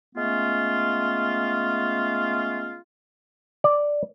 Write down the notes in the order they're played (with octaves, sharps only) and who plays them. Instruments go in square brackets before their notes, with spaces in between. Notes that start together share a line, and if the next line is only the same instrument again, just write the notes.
[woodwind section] G#3 A3 B3 C#4 F4
[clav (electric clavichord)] D5